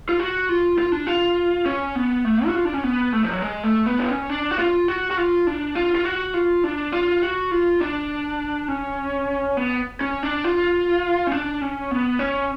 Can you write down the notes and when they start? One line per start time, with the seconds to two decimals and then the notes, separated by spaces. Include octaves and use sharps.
0.09 F4
0.20 F#4
0.49 F4
0.78 F4
0.92 D4
1.07 F4
1.66 C#4
1.96 B3
2.25 A3
2.47 F#4
2.55 F4
2.65 D4
2.74 C#4
2.84 B3
3.13 A3
3.24 F3
3.32 F#3
3.42 G#3
3.64 A3
3.86 B3
3.98 D4
4.07 C#4
4.30 D4
4.51 F#4
4.59 F4
4.88 F#4
5.11 F#4
5.17 F4
5.47 D4
5.75 F4
5.95 F4
6.05 F#4
6.34 F4
6.64 D4
6.92 F4
7.23 F#4
7.51 F4
7.81 D4
8.68 C#4
9.57 B3
10.01 C#4
10.23 D4
10.44 F4
11.27 C#4
11.32 D4
11.61 C#4
11.91 B3
12.19 C#4